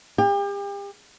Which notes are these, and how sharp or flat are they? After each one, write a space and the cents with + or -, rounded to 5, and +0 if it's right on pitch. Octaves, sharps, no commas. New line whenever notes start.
G4 +40 G5 +35